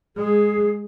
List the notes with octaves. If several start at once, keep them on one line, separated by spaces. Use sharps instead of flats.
G#3 G#4